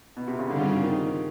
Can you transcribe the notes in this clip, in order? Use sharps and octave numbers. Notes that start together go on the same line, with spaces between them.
B2
C3
C#3
G2 D3 D#3 G3 C4 F4
C#3
D#3